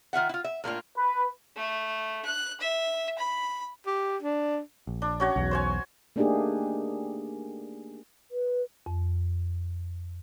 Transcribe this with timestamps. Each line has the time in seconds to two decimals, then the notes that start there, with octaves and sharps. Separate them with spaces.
0.13 D#3 F4 E5 F#5
0.29 E4 F4
0.44 E5
0.64 A2 A#3 D4 F4
0.96 B4
1.56 A3
2.25 F#6
2.60 E5
3.18 B5
3.86 G4
4.22 D4
4.87 A#1
5.02 D4
5.20 C#4 F#4 C#5
5.36 B1 E2
5.51 C5 C#5 G#5
6.16 A3 A#3 D4 D#4 G4 G#4
8.31 B4
8.86 F2